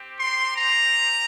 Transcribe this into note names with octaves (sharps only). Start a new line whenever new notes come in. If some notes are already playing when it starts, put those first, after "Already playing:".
Already playing: C4 G4
C6
A#5